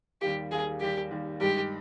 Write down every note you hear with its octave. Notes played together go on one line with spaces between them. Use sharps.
D#2 D#3 G3 A#3 G4
D#2 D#3 G3 A#3 G#4
D#2 D#3 G3 A#3 G4
D#2 D#3 G3 A#3
G2 D#3 G#3 G4